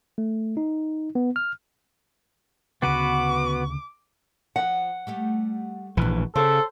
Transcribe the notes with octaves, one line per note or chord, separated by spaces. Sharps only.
A3
D#4
B3
F6
D2 C#3 B3 F#4 B4 D6
F3 F#5
G3 A3 G4
A#1 G#2 B2 E3
C#3 A4 C5 F5